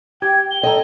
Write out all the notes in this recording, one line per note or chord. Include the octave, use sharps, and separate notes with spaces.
G4 G5 G#6
G5 G7
A4 D#5 G5 A#5